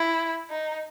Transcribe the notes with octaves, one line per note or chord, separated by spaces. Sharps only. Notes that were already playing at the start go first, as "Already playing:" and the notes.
Already playing: E4
D#4